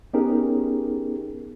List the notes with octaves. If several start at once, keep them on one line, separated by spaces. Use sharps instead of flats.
B3 C#4 D#4 G4 G#4 A#4